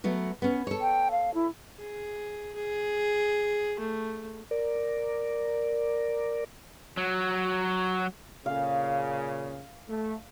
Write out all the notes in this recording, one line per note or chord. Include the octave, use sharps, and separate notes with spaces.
F#3 A3 B3
B3 C#4
A4 C#5
G5
F5
E4
G#4
G#4
A3
A#4 D5
F#3
A#2 C#3 F5
A3